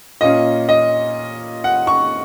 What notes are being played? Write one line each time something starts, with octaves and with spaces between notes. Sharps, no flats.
A#2 A#3 C#4 D#5
D#5
F#5
C#6